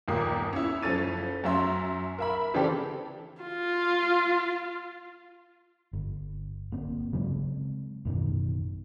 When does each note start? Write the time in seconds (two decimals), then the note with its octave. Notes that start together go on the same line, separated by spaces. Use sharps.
0.08 G1 D#2 A#2 A#3 D#6
0.53 C#4 E4
0.82 F#1 F3 C#4 A4 A6 D#7
1.44 F#2 C#4 E5 C6
2.18 A#4 E5 B5
2.54 C#3 E3 C4 D4 G4 A4
3.42 F4
5.93 G1
6.72 G1 A#3 C4
7.13 C#3 F#3 G#3 C4
8.05 A1 F#2 B2 D#3